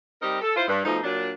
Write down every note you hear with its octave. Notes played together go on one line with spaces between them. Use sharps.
G3 C4 D#4 G4 A#4
A4
E4 F4 C5
G2
B2 F3 A3 D#4
A#2 F#3 D4